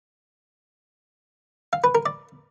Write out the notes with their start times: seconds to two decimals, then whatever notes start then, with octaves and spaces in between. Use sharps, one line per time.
1.73 F5
1.84 B4
1.95 A#4
2.06 D5